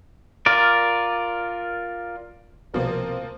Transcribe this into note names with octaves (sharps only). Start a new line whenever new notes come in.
F4 A#4 D5
C2 B2 F3 A#3 C4 A#4